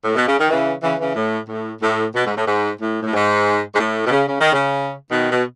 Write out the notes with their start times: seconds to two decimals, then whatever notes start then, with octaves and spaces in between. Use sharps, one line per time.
0.04 A2
0.15 B2
0.27 C#3
0.39 D#3
0.49 C#3 E3
0.83 C#3 E3
0.99 C#3 E3
1.15 A2
1.48 A2
1.82 A2
2.14 B2
2.26 G#2
2.36 A2
2.47 G#2
2.80 A2
3.02 A2
3.13 G#2
3.75 G#2
3.79 A2
4.06 B2
4.11 C#3
4.27 C#3
4.40 D#3
4.52 C#3
5.10 B2 D#3
5.31 B2